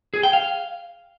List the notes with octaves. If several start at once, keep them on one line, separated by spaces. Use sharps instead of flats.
G#4
G5
F5